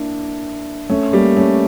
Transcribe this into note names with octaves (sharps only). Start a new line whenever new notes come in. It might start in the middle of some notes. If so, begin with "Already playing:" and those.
Already playing: A#3 D4 E4
A3 C#4
G3 A#3
A3 C#4